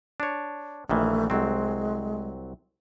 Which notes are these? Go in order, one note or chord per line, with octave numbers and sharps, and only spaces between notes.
D4 C#5
A#1 D#3 E3 A3
C2 F#3 G#3 C4